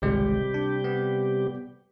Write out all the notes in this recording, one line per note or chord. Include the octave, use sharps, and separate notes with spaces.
G#1 C#2 C3 G3 G#3 G4
D4
B3